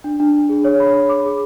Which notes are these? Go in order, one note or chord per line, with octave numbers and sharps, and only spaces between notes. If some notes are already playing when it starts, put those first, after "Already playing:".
D4
D4
D4
G#4
C#5
B5
C#5
D6
G#4